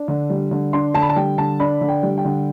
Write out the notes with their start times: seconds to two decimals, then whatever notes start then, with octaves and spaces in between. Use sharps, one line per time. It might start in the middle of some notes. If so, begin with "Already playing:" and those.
Already playing: D4
0.08 D3
0.30 G3
0.51 D3
0.73 D4 C6
0.94 D3 A5
1.02 B5
1.09 A5
1.16 G3 G5
1.38 D3 A5
1.60 D4 B5
1.81 D3
1.88 G5
2.03 G3
2.17 G5
2.25 D3